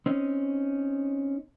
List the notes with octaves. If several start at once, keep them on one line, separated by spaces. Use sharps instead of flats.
C4 C#4 D#4